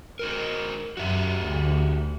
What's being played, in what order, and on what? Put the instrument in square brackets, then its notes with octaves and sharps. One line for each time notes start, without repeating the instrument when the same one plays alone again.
[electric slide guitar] D#4 F#4 A#4
[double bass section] F#2 [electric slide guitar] F#4 G4 E5
[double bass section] D2